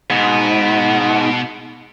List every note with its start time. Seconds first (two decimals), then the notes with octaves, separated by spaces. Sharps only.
0.10 G#2 B2 B3